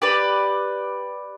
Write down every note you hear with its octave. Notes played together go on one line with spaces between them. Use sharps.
G4 B4 D5